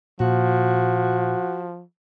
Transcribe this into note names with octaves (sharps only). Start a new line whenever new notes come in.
A#2 F3 F#4